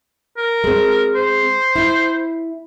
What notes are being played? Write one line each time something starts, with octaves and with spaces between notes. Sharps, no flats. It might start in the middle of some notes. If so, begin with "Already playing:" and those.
A#4
G#3 C4
C5
E4